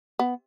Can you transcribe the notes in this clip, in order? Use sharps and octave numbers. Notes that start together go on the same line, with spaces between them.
B3